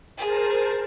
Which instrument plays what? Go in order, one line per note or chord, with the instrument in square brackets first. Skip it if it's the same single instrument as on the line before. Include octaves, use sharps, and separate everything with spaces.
[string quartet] G#4 [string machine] A#4 C5 A5